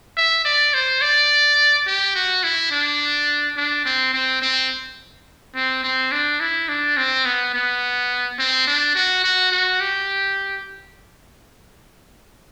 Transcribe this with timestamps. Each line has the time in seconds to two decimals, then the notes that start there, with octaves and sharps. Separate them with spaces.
0.17 E5
0.45 D5
0.74 C5
1.02 D5
1.87 G4
2.15 F#4
2.44 E4
2.72 D4
3.57 D4
3.85 C4
4.14 C4
4.42 C4
5.55 C4
5.84 C4
6.12 D4
6.41 E4
6.69 D4
6.97 C4
7.25 B3
7.54 B3
8.39 C4
8.67 D4
8.96 F#4
9.24 F#4
9.52 F#4
9.80 G4